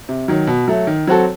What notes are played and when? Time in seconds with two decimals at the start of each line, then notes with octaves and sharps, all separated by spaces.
0.09 C3
0.28 D#3 F#3
0.47 B2
0.68 F#3 A3
0.87 D#3
1.07 F#3 C4 F#4 A4